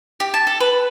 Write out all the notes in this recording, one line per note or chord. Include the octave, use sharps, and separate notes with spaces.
G4
A5
A4
B4